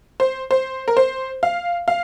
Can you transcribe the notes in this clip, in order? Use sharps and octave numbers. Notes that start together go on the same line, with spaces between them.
C5
C5
A#4
C5
F5
F5